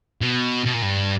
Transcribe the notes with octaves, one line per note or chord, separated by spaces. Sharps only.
B2
B2
A#2
G2